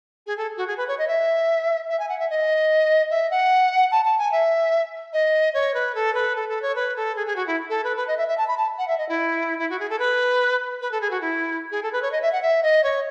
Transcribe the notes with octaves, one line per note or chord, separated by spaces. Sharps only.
G#4
A4
F#4
G#4
B4
C#5
D#5
E5
E5
G#5
F#5
E5
D#5
E5
F#5
A5
A5
G#5
E5
D#5
C#5
B4
A4
B4
A4
A4
C#5
B4
A4
G#4
G#4
F#4
E4
A4
B4
B4
D#5
E5
E5
A5
B5
A5
F#5
E5
D#5
E4
E4
F#4
G#4
A4
B4
B4
A4
G#4
F#4
E4
G#4
A4
B4
C#5
D#5
E5
F#5
E5
D#5
C#5